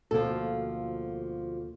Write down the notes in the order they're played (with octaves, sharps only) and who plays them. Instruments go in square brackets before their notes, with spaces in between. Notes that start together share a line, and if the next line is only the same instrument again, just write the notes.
[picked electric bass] D2 B2 A#3 [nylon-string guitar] F3 A4